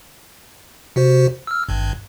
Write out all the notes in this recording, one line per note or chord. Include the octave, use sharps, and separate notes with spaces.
C3 F#4 C5
E6 F6
G#1 G2